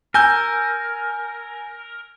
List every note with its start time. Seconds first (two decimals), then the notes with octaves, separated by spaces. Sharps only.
0.14 A#4 G#5 E6 G6